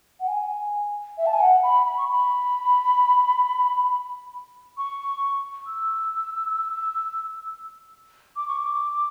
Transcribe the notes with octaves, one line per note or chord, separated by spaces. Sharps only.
F#5
G#5
E5
A5
G#5
F#5
B5
B5
C#6
B5
C#6
E6
D6
C#6
D6